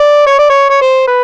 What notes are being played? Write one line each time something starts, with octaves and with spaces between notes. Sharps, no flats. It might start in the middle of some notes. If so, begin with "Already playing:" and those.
Already playing: D5
C#5
D5
C#5
C#5
C5
B4